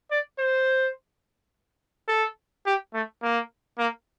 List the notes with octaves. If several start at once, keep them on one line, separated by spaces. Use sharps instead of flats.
D5
C5
A4
G4
A3
A#3
A#3